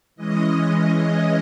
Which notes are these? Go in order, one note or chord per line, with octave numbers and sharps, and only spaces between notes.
E3 G#3 C#4 D#5
D#5